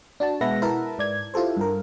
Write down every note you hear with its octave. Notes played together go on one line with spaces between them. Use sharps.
D4 F#4 A5
B2 G#3 B4 E5 F#5 A#6
E4 A#4 B4 E5 A5
G#2 D5 G#6
E4 F4 G4 A4 C5
G2 A#4